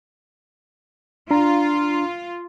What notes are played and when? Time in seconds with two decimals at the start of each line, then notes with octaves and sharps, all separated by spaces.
1.31 D4 F4 A#5